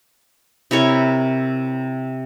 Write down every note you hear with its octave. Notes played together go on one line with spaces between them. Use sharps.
C3 E4 A#4 C#5